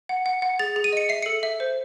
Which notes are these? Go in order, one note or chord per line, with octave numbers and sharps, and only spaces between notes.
F#5
F#5
F#5
G#4 A6
G#4
D#7
D#5 C#7
E5 C7
A4 C#7
E5
C5